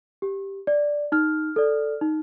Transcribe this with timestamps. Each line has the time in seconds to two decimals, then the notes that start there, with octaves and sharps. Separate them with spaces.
0.22 G4
0.67 D5
1.12 D#4 F6
1.56 A4 D5
2.01 D#4